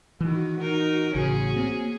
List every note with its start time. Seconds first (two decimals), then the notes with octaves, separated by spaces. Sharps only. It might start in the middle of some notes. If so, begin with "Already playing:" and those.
0.20 D#3 E3 F#4
0.61 D#4 A#4
1.15 A1 C#3 C#4 G#4
1.56 A#3 C4